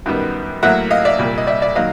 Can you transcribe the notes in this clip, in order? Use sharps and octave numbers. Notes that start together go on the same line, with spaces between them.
F#2 D#3 G3 B3
A2 F#3 A#3 E5 F#5
D#5 F5
D5 E5
C2 A#2 G3
D#5
D5 E5
D5 E5
D#3 F#3 A#3 D#5 F5